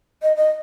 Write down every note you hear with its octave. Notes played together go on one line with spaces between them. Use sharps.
D#5
D#5